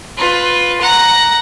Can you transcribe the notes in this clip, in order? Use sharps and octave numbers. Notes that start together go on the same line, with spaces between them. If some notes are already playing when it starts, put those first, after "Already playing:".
F4 B4
F#5 A#5